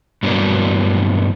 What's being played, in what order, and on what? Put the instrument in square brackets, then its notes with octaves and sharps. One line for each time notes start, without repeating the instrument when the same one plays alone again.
[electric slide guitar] G2 B2 E3 F#3 A#3 D4